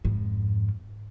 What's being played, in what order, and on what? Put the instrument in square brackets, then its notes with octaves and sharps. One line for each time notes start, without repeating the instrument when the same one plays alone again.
[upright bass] F2 G#2